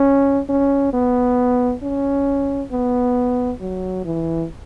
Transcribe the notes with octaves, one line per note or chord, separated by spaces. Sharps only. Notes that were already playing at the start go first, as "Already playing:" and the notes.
Already playing: C#4
C#4
B3
C#4
B3
F#3
E3